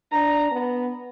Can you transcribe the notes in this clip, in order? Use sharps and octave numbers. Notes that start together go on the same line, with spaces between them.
D4 A#5
B3